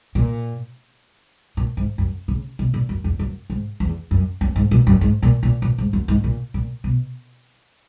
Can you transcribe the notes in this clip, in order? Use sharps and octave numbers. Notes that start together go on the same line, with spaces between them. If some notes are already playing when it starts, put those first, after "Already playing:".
A#2
A#2
G#2
F#2
C#3
B2
A#2
F#2
E2
F#2
G#2
E2
F#2
F#2
G#2
A#2
F#2
G#2
A#2
A#2
A#2
G#2
F#2
G#2
A#2
A#2
B2